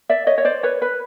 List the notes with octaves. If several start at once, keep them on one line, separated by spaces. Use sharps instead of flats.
D5 E5
C#5 D#5
C#5
C5 D5
B4 C#5
B4